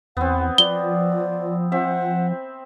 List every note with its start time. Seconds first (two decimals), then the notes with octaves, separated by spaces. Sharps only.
0.17 E2 B3 C4 F#5
0.58 F3 D5 G7
1.72 C4 E5 F#5